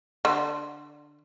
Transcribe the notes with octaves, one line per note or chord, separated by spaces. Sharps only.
D3